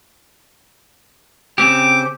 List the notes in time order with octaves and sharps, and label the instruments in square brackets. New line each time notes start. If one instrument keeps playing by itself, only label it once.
[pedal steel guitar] C#3 C4 G4 [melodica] D6